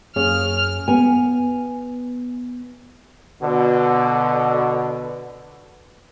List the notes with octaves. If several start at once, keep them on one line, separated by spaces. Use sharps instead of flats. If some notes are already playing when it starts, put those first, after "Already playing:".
F#2 A#3 G#4 C#5 F6
B3 G#5
B2 D3